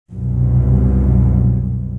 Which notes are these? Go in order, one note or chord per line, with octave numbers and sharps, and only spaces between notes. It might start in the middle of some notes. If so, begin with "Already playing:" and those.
C2 F#2 B2